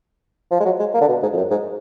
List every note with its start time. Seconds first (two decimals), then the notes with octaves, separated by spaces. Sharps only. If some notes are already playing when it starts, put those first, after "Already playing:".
0.51 F3
0.60 G#3
0.65 F#3
0.79 G#3
0.94 A#3
1.01 D3
1.08 B2
1.22 G#2
1.33 F2
1.37 F#2
1.50 G#2